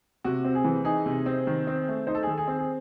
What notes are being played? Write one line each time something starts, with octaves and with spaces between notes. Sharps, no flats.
C3 F#4
C4
G#4
E3
D#4 G#4
C3
C4
D#3
C4
A3
D#4 C5
A4
G#4
D#3 A4
G#4
C4
G#4